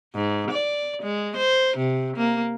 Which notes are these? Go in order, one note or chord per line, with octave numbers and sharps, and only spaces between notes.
G#2
D5
G#3
C5
C3
A#3